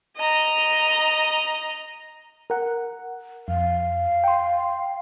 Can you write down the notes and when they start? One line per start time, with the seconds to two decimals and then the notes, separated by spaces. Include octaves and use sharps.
0.17 D#5 A#5
2.50 A#4 F#5
3.48 F2 F5
4.24 G5 C6